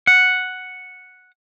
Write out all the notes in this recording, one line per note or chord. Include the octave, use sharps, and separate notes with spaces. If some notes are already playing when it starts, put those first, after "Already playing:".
F#5